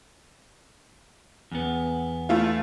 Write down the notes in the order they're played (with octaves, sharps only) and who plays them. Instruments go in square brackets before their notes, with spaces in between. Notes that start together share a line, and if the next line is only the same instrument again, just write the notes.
[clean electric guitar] E2 B3
[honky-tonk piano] A3 E4 F4